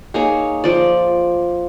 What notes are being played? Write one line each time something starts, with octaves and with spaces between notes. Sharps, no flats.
A#3 D#4 G#4 C#5
F3 D5